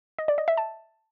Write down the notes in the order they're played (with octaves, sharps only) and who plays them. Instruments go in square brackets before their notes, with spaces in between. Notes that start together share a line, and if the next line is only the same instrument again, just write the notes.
[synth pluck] D#5
D5
D#5
E5
A5